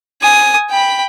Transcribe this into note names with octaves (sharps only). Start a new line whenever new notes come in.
G#5 D#6
G5 B5